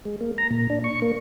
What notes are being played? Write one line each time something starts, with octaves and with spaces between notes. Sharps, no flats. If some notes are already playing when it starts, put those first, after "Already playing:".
G#3
A#3
A#5
A#2
D4
C#6
A#3